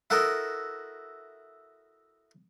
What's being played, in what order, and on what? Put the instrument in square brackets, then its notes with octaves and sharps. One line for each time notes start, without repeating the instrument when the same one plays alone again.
[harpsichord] E4 F#4 A4 A#4 D#5